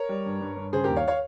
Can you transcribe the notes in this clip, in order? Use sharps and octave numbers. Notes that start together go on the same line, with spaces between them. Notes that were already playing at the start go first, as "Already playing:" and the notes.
Already playing: A#4 C#5
G3
G2
G2
G2
C#3 G#4 C5
D#2 G4 A#4
C#5 F5
C#5 F5